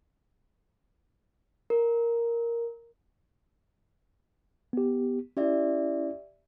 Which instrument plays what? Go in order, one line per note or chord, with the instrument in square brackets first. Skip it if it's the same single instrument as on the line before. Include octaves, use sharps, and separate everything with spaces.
[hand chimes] A#4
[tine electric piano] B3 G4
[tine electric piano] C#4 E4 [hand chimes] G4 D5 E5